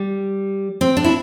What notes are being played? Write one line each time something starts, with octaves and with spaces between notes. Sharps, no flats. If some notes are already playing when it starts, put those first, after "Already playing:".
Already playing: G3
C4
D4
E4